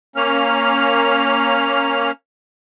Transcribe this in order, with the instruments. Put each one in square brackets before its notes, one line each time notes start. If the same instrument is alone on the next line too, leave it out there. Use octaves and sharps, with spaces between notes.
[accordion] A#3 C#4 F6